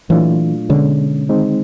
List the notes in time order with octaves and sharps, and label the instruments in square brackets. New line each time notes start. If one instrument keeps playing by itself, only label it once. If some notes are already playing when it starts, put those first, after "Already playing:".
[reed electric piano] A#2 F#3 A3 D4 F4 [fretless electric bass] E3
[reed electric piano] B2 G#3 C#4 [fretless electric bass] D3
[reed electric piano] D#3 G#3 C4 D#4